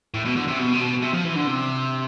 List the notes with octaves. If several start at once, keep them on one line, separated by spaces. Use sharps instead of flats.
A2
B2
D3
C3
B2
C3
B2
C3
F3
E3
D3
C3